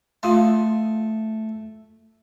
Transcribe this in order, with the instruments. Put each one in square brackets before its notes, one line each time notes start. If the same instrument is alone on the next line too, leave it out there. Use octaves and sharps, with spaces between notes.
[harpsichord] A3 [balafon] F4 F5 C6